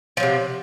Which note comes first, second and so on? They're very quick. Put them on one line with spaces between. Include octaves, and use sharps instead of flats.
F3 F#3 C3